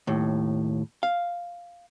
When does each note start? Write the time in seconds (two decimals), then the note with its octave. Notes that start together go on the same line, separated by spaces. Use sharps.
0.07 D#2 A2
1.03 F5